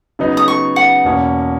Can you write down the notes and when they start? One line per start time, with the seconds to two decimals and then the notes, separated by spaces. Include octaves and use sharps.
0.19 C#3 F#3 B3 D#4
0.37 D#6
0.48 C#6
0.76 F#5
1.04 E2 B2 A#3 C#4